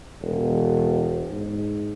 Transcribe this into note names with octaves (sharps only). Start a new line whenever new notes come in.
E1
G#2